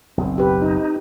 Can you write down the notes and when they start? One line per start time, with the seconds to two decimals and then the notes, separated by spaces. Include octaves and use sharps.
0.18 F#1 B1 C4
0.38 G4 B4
0.62 D#4